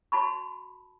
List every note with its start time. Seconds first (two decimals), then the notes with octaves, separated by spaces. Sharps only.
0.12 F#4 A5 B5 C#6